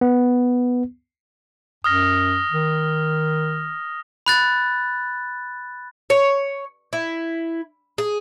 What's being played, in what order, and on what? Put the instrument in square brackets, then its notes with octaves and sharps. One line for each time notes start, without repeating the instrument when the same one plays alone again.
[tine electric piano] B3
[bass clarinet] F#2 [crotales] D#6 F6 A#6
[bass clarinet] D#3
[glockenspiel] B5 F#6 A6
[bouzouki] C#5
E4
G#4